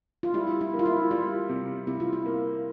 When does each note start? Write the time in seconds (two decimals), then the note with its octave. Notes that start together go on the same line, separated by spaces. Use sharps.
0.23 F4
0.34 G3 E4
0.61 E4
0.74 A#3
0.79 F4
0.86 E4
1.11 G3 F4
1.49 C3
1.87 C3 E4
2.00 F4
2.13 E4
2.26 A#3